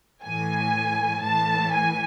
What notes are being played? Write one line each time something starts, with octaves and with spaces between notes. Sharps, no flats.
A2 E3 G#5
A2 E3 A5
G#5